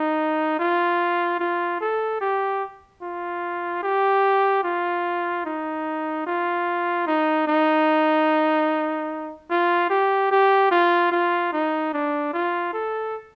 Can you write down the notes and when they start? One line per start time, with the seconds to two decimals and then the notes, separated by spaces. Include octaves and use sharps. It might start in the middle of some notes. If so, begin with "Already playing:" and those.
Already playing: D#4
0.59 F4
1.40 F4
1.81 A4
2.21 G4
3.02 F4
3.83 G4
4.64 F4
5.45 D#4
6.27 F4
7.07 D#4
7.47 D#4
9.50 F4
9.90 G4
10.31 G4
10.71 F4
11.12 F4
11.53 D#4
11.93 D4
12.33 F4
12.73 A4